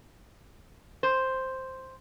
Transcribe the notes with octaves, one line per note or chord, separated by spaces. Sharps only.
C5